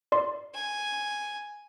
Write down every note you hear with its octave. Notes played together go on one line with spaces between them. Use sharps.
D5 C6
G#5